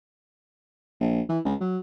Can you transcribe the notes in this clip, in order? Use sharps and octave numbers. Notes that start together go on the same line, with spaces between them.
A#1
E3
C#2
F#3